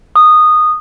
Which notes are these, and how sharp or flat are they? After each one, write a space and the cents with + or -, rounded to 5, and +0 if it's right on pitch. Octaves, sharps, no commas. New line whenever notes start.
D#6 -15